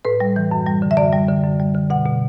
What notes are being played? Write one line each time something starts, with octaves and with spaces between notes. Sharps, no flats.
A2 B4
G3
E3
F#2
G3
D3
E5
F#2 D5
G3
D3
F#2
G3
D3
B2 F#5
B2